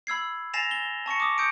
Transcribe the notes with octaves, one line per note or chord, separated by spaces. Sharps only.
B5 E6 G#6 C7
G#5 A6 A#6 C7 E7 F7
G7
A5 C#6 A#6 C#7
D6 D#6
D#6 G6 C#7 D7